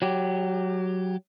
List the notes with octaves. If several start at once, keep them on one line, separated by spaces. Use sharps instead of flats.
F#3 G4